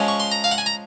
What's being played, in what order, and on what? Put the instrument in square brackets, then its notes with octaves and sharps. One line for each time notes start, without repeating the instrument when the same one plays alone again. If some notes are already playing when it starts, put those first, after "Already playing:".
Already playing: [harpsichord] F3 G#3 C#4
C#6
C6
A#5
F5
F#5
G#5
A#5